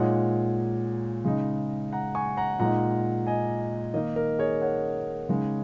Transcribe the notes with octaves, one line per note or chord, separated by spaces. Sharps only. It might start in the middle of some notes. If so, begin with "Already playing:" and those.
Already playing: A#2 G#3 D#4 C#5 F#5
C#3 G#3 D#4
F#5 A#5
G#5 C#6
F#5 A#5
A#2 G#3 D#4 F#5 A#5
D#5 G#5
D#3 A#3 D#4 A#4 D#5
A#4
G#4 C#5
C#5 F#5
C#3 G#3 D#4